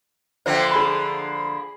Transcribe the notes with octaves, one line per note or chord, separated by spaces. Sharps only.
D3 F3 A#3 C5 E5 G5
G#4 B5